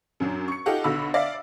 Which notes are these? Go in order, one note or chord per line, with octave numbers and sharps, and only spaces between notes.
F#2 F#3 D4
C#6 C#7
D#4 F4 G4 A4 F#5
B1 D3 F#4 B5 E6
D5 E5 F5